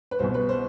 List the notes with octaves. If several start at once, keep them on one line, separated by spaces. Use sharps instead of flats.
B4
C2 B2 C5
B4
C5